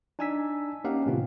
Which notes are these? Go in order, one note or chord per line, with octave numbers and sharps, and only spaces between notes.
D4 D#4 G#5 A5 E6 B6
A#3 C#4 D#4 G4 F5 F#5
A2 C3 D#3 B3 C4 F4